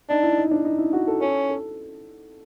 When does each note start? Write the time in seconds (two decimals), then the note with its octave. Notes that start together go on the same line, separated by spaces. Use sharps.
0.09 D4 D#4
0.23 E4
0.37 D#4
0.51 D4
0.65 D#4
0.78 E4
0.93 F#4
1.07 A4
1.21 C#4 A4
1.49 A4